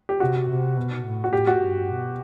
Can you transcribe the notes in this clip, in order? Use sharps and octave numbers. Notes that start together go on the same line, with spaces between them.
G4
C3 F#4
C3
B2
A2
F#4
A2 G4
F#4
G2
B2